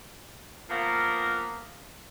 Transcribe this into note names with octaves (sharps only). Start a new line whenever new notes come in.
F3 A#3 B3 A#4